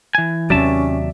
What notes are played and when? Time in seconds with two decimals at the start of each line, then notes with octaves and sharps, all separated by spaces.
0.15 E3 G#5
0.50 D#2 C3 F#3 C#4 D5 E5 A5